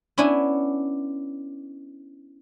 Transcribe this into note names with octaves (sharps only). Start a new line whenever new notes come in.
B3 C#4 D4 E4